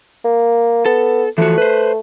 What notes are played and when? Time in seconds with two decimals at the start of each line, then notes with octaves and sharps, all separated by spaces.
0.24 A#3
0.86 B3 A4
1.38 E3 F3 A3 F#4
1.58 B4 C5